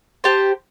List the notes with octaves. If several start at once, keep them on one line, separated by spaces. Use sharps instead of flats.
G4 C5 A5